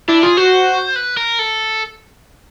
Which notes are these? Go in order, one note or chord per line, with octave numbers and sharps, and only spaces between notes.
D4 E4
F4 G#4
F#4 C5
B4
A#4
A4